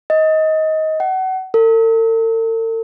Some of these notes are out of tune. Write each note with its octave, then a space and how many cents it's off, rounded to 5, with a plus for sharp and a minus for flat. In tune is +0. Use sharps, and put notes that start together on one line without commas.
D#5 +20
F#5 +30
A4 +45